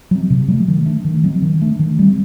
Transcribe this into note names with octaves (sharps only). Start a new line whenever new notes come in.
F#3 C4
C3
F#3 A3
D#3
A3 D4
D#3
F#3 C4
D#3
A3 D4
D#3
G3 C4